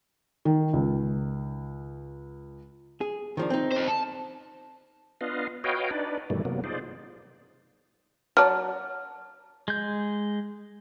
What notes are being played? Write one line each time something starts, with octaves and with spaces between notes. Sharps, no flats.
D#3
C#2
G#4
D#3 F3 D4
C4 D#4
A4 C5
A5
B3 D4 F4 B4 D#5 F5
F#4 B4 C#5 D#5 F5 G5
D4 D#4 B4 D5
G2 B2 D#3 E3 G3 A3
C3 F#3 A#3 B3
D#4 F4 G#4 C5 D5
F#3 D5 A5 F6
G#3 G6